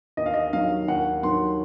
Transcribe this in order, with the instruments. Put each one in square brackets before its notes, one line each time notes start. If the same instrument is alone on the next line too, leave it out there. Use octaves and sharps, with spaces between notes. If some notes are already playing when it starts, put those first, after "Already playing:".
[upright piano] D#2 D#5
F5
D#5
D#3 F#3 F5
D#2 F#5
D#3 F#3 C6